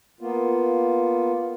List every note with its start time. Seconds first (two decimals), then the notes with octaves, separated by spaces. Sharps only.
0.21 A#3 B3 F4